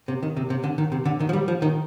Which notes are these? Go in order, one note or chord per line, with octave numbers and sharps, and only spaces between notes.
C3
D#3
C3
C3
D3
D#3
C3
D3
D#3
F3
G3
F3
D#3